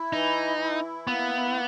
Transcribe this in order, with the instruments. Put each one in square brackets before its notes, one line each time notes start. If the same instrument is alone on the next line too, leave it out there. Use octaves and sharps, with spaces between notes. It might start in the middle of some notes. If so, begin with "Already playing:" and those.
Already playing: [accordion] E4
[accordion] E3 [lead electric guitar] D#4
[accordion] E4
[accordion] A#3 [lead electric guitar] B3